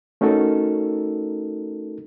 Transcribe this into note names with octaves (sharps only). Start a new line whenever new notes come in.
A3 C#4 D#4 F#4 A4 A#4